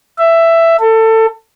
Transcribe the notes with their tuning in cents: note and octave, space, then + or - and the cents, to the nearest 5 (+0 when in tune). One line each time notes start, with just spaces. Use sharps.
E5 +10
A4 +25